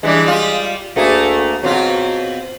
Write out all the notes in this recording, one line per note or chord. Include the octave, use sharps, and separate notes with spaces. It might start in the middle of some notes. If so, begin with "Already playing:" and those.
E3 G3 G#3 D4
G3 F4
D2 A3 A#3 G#4
B2 F#3 C4 F4